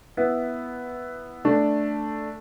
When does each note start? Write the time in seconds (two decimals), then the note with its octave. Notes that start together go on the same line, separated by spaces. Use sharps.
0.17 B3 E4
1.45 A3 D4